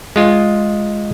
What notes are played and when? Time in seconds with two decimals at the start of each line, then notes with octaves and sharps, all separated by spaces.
0.16 G#3 F4